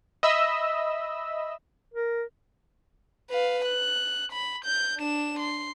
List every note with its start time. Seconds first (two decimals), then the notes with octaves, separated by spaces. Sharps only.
0.23 D#5 E5 B5 E6
1.94 A#4
3.30 B4 F5
3.66 F#6
4.32 B5
4.65 G6
4.98 D4 E7
5.39 C6